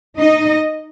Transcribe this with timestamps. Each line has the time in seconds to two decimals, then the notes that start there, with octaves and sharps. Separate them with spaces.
0.18 D#4 D#5